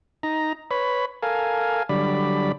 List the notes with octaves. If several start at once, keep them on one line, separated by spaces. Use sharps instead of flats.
D#4 A#5
B4 C#5 B5
A4 A#4 F5 G#5
D3 F#3 G3 D5 B5